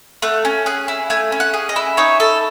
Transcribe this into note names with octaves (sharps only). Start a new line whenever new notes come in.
A3 F#5
C#4
G#4 F#5
E4
A3 G#5
C#4
F#5
G#4
D#5
E4
D#4 C#5
A4